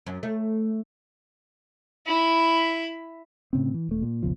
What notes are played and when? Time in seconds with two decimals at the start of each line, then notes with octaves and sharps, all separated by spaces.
0.06 F#2
0.23 A3
2.07 E4 B5
3.53 A2 C#3 C4
3.74 E3
3.89 D#1 A3
4.02 A#2
4.23 F#1 C#2 B2 F3